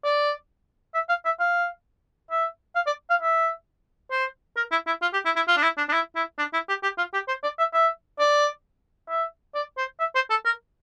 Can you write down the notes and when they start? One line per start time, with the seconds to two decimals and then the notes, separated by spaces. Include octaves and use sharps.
0.04 D5
0.94 E5
1.09 F5
1.25 E5
1.40 F5
2.31 E5
2.76 F5
2.87 D5
3.10 F5
3.21 E5
4.11 C5
4.57 A#4
4.72 E4
4.87 E4
5.02 F4
5.13 G4
5.25 E4
5.36 E4
5.48 F4
5.57 D4
5.63 E4
5.78 D4
5.89 D4
5.93 E4
6.16 E4
6.38 D4
6.53 E4
6.69 G4
6.83 G4
6.98 F4
7.14 G4
7.28 C5
7.43 D5
7.59 E5
7.74 E5
8.20 D5
9.09 E5
9.55 D5
9.78 C5
9.99 E5
10.15 C5
10.30 A4
10.46 A#4